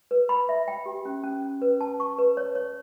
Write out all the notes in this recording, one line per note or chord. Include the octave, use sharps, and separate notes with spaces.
B4
B5
E5
G5
G4
C#4
C#4
C#4
B4
A5
C#6
B4
C#5
C#5